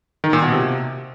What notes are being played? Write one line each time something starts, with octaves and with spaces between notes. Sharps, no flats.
D#3
A#2
B2
C3